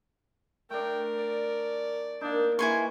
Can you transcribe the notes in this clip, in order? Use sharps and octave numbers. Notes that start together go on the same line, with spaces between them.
A3 D4 A#4 G5
D5
A#3 D4 D#4
A#3 E4 B4 G#5 C6 C#6